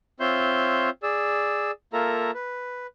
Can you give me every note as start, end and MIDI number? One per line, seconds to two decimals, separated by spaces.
0.20 0.90 60
0.20 0.90 65
0.20 0.90 73
0.20 0.90 76
0.20 0.90 84
0.20 0.90 91
1.03 1.71 68
1.03 1.71 74
1.03 1.71 88
1.93 2.31 58
1.93 2.31 65
1.93 2.31 69
1.93 2.31 70
1.93 2.31 76
1.93 2.31 82
2.34 2.87 71